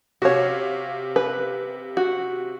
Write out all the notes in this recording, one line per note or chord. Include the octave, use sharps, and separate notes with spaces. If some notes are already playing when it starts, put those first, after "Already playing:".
C3 F#4 C#5 F5
B4
F#4